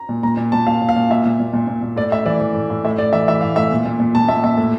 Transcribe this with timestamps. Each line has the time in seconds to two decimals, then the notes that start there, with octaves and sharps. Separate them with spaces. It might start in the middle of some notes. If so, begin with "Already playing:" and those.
Already playing: A#5
0.09 A#2
0.23 A#2 A#5
0.37 A#2
0.52 A#2 A5
0.67 A#2 F5
0.82 A#2
0.89 F5
0.96 A#2
1.10 A#2 E5
1.25 A#2
1.40 A#2
1.53 A#2
1.68 A#2
1.82 A#2
1.97 A2 D5
2.11 A2 E5
2.26 E3 D5
2.40 E3
2.55 A2
2.70 A2
2.85 A2 E5
2.98 A2 D5
3.13 E3 E5
3.28 E3 E5
3.41 A2 F5
3.56 A2 E5
3.72 A#2
3.85 A#2
4.00 A#2
4.15 A#2 A5
4.29 A#2 E5
4.44 A#2 E5
4.57 A2